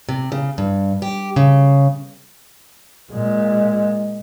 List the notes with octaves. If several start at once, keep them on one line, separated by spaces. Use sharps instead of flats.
C3
C#3
G2
G4
C#3
A#2 G#3